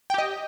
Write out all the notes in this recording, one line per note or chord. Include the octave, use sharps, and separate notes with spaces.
G4 D#5 G5